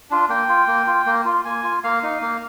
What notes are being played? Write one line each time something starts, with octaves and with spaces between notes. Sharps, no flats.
D4 F4
A#3 G5
F4
A#3
F4
A#3
F4
A#3 G#5
F4
A#3 F5
D#4
A#3